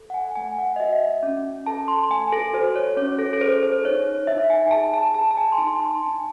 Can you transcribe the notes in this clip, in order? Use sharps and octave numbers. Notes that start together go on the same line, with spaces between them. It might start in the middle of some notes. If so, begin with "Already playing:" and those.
Already playing: A4
F#5
G#5
A3 G#5
F#5
D#5
F#4 E5
C#4
A4 A5
C6
A3 G#5
A4
F#4 C5
C#5
C#4 C#5
A4
A4
G#4 C5
C5
D#4 C#5
D#4 E5
G#5
G#4 A5
A5
G#4 A5
A5
G#5
C6
D#4 A5
A5
C6
D#4 G#5